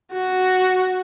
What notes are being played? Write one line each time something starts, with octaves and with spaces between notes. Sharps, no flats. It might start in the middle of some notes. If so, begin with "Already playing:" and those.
F#4